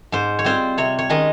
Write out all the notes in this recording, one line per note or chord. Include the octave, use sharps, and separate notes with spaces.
G#2 C5
C#5
G3 C4 F4 C5
C3 C#5
C#5
D#3 G#3 C#4 D#5